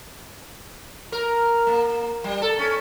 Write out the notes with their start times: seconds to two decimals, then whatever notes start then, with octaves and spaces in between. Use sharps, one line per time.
1.12 A#4
1.67 A#3
2.24 G3
2.42 A4
2.59 C#4